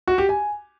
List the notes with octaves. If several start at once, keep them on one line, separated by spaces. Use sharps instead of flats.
F#4
G4
G#5